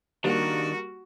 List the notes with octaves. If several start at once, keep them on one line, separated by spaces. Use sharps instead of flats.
D#3 G3 A#3 D4 F#4